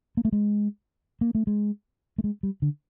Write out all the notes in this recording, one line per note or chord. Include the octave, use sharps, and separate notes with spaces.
A#3
A3
G#3
A#3
A3
G#3
A3
G#3
G3
D3